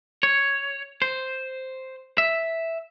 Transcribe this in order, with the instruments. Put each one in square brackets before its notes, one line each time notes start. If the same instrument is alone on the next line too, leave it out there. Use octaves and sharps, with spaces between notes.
[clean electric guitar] C#5
C5
E5